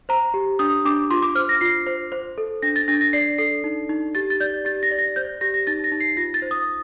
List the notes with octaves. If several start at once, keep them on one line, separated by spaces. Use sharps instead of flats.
C5 A#5
G4
D4 D#6
D4 D6
F4 C6
D6
C5 F6
A#6
F4 C7
C5
C5
A4
D4 A#6
A6
D4 A#6
A#6
D5 C7
A4 C7
D#4
D#4
G4 A6
A6
D5 G6
G4 A6
A#6
D5
A#6
C5 G6
G4 A#6
A#6
D#4 A6
A#6
D#4
C7
F4 A#6
A6
C5
D#6